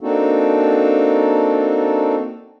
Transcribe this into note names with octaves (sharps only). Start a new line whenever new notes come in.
A#3 C4 D4 D#4 F#4 A4